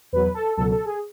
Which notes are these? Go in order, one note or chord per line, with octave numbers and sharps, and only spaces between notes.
E2 B2 F#3 B4
A4
C#2 B2 F#3 A4
A4
G#4